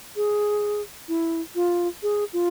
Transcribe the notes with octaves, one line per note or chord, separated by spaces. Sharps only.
G#4
E4
F4
G#4
F4